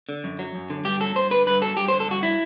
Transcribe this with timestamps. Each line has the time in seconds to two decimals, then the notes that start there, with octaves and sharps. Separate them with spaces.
0.09 D3
0.24 F#2
0.39 F#3
0.55 F#2
0.70 D3
0.85 G2 G4
1.00 F#3 A4
1.15 G2 C5
1.31 D3 B4
1.47 G2 B4
1.62 F#3 A4
1.77 G2 G4
1.88 C5
1.92 D3
2.00 A4
2.07 G2 F#4
2.23 F#3 E4